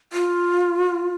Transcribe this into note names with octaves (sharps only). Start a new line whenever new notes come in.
F4